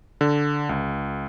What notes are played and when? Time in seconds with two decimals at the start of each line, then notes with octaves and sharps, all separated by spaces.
0.21 D3
0.69 C#2